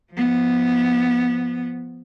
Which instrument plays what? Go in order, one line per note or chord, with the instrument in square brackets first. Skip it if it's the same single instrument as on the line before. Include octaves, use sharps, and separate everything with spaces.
[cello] F3 B3